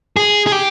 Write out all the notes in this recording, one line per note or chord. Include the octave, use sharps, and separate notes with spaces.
G#4
G#4
G4